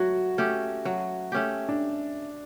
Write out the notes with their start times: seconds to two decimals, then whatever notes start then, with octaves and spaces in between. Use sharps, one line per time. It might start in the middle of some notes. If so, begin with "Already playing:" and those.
Already playing: F#3 A3 F#4
0.38 A3 C#4 G4
0.85 F#3
1.32 A3 C#4 G4
1.69 D4